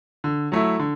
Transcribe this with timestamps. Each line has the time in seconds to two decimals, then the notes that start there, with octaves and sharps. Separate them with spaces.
0.24 D3
0.52 F#3 A3 E4
0.79 D3